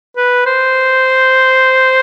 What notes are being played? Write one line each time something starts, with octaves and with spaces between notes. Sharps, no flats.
B4
C5